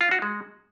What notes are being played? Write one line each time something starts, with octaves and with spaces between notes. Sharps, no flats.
F4
F#4
G#3